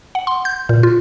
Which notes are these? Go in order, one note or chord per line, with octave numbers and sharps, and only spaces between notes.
F#5
C6
G6
A#2
F4